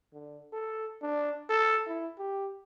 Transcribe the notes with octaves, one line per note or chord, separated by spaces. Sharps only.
D3
A4
D4
A4
E4
G4